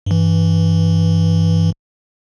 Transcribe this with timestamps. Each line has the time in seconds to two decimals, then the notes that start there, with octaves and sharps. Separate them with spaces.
0.06 G2 E3